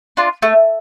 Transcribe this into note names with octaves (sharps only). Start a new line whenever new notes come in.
D4 F4
A3